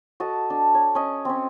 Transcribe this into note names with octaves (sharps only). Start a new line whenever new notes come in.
F#4 A4 D#5 A5
D4
C#5
C#4 D#5
C4 C#4